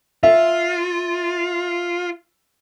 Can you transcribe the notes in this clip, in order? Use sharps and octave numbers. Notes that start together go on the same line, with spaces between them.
F4 E5